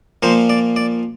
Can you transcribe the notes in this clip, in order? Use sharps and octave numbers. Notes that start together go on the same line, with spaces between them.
A#2 F3 A#3 C5
D5
D5